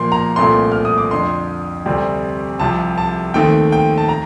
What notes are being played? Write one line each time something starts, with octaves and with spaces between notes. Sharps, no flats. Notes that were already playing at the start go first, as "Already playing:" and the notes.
Already playing: A#2 F3 A#3 C6
A#5
C2 A#2 A3 C4 C6
F6
D#6
D6
F2 D3 F3 C6
D2 C3 G3 C4
C2 C3 F3 A5
A5
D#2 D#3 A3 C4 G5
G5
A5
A#5